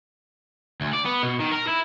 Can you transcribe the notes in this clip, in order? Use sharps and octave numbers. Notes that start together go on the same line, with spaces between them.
D2
D5
B3
B2
D#3
A#4
E4